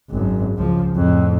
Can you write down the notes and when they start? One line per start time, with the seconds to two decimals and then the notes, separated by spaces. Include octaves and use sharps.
0.11 G#1 F#2
0.57 C#2 F3
0.96 F2 A2